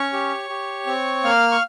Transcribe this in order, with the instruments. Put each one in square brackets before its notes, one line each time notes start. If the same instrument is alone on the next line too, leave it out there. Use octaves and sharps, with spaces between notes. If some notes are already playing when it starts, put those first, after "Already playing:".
Already playing: [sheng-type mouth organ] C#4 C#5 C#6
G4
G4
C4
A#3 F5 F6
C#6